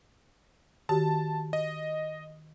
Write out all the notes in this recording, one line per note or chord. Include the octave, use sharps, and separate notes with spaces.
D#3 F#4 G4 A5
D#5